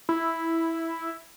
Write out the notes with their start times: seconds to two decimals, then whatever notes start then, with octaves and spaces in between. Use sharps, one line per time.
0.09 E4